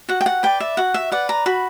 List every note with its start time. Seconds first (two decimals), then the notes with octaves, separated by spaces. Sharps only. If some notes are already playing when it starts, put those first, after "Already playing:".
0.09 F#4 F#5
0.21 G5
0.26 F#5
0.43 B4 D5 G5
0.60 E5
0.77 F#4 F#5
0.94 E5
1.12 B4 D5 F#5
1.29 A#5
1.46 F#4 B5